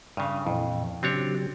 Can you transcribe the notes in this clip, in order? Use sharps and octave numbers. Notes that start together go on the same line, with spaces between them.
G2 C#3 D#6 F6
F2 A#2 E3
C#3 F#3 C4 D4 G4 C#5